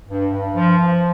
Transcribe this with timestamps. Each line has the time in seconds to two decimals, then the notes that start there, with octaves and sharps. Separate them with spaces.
0.08 G2
0.32 G2
0.56 F3
0.79 F3